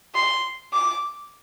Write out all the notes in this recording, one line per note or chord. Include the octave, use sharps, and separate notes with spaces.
C6
D6